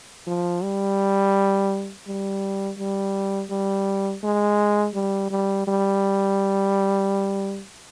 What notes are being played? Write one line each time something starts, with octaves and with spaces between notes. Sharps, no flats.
F3
G3
G3
G3
G3
G#3
G3
G3
G3